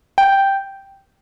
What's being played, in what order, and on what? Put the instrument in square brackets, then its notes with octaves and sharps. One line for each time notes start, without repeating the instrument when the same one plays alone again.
[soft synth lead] G5